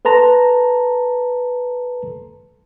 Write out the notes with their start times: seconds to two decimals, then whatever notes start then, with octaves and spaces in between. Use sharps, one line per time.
0.05 A4 B4 A5 A#5 C6